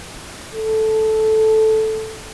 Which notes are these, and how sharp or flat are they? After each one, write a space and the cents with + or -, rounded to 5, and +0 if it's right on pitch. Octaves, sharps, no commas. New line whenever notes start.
A4 -10